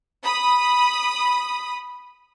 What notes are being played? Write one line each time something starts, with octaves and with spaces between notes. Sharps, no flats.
B5 D#6